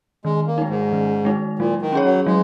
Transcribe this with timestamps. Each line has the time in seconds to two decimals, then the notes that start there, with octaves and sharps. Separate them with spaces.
0.25 D#3 G#3
0.47 A#3
0.58 G#3 D#4
0.69 G#2
0.92 D#3
1.25 G#3 D#4
1.59 A#2 F#3
1.82 D#3
1.92 C#4 G#4 C#5
2.04 F#3
2.26 F#3 G#3